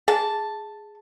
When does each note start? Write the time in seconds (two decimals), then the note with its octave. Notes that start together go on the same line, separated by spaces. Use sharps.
0.08 G#4 A5